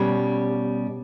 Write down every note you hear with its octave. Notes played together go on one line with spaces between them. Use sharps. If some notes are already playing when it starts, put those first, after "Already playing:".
Already playing: B2 G3 C#4 G4